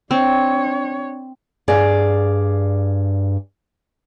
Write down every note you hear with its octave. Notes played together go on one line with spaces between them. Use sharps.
C4 D4 C#5
G2 G#4 D5 F5